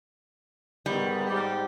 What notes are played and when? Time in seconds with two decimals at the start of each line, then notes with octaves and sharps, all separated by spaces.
0.86 G#2 D#3 G3 B3
1.29 G#2 G4